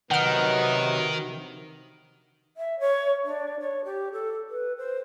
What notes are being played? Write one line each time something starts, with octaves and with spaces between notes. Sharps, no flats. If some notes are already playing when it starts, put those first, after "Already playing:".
C3 D#3 F#3 B3 D#4 F#5 F6
E5
C#5
D4
C#5
G4
A4
B4
C5